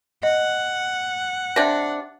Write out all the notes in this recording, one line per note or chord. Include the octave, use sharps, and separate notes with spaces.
D#5 F#5
C3 D4 A#6